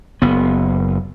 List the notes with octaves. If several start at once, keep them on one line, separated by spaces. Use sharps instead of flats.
F#1 B3